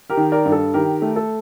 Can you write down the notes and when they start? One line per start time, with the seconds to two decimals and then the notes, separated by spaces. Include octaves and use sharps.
0.10 G4 A#4
0.17 D#3
0.32 A#4 D5
0.45 G2
0.52 A4
0.74 D#3 G4 A#4
1.02 A3
1.16 A4